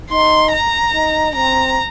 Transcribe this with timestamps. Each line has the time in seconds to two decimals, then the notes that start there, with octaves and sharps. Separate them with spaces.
0.11 D#4 C6
0.52 A#5
0.93 D#4
1.35 C4 A#5